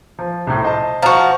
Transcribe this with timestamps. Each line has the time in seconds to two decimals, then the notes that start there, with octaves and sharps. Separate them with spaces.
0.19 F3
0.47 C2 A2
0.62 C5 D#5 A5
1.02 F3 F#4 A5 A#5